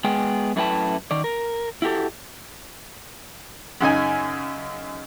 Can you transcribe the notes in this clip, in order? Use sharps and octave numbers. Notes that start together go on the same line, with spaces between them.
G#3 B3 G#4 G5
F#2 A3 E4 B4 G5 A5
D#3 D5
A#4
E4 F#4 G4 A4
F#2 C#3 D#4 G#5